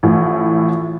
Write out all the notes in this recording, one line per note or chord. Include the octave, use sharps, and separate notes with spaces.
A1 A2 F3